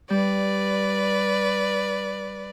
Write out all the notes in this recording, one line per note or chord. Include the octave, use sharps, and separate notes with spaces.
G3 B4 D5